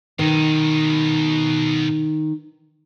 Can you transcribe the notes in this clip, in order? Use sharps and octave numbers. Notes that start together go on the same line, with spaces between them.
B2 D#3 D#4